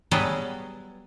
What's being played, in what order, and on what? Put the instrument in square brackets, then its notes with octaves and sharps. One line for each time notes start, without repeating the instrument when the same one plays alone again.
[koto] F#3 G3 B3 G#4 A4 B4